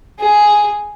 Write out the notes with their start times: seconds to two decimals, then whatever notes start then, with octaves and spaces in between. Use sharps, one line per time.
0.20 G#4